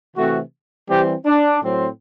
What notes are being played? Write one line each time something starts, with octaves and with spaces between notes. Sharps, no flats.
C3 E3 A3 C4 F#4
E3 G3 C4 G4
D4
A2 F#3 C4